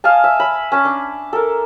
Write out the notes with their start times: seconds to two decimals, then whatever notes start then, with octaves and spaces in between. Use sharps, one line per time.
0.04 D#5 F5 G#5 A5
0.24 E5
0.40 B5
0.72 C#4 A5
0.85 D4
1.33 A4 A#4